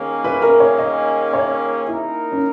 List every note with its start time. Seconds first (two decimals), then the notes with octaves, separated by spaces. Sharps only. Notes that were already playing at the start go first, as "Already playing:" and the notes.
Already playing: D#3 A#3 C#4 G#4
0.24 B4
0.42 A#4
0.60 C#5
0.78 D#5
1.33 C#5
1.87 A#3 D#4 E4 A#4
2.32 C#4